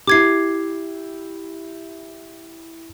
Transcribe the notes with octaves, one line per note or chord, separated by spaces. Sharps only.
E4 G4 D6 G#6 C7